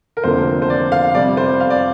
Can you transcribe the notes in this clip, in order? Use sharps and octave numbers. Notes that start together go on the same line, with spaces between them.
A#4
F1 F2 D3 F3 A#3 C5
C5
D5
F5
F2 C3 G3 D5
C5
F5
D5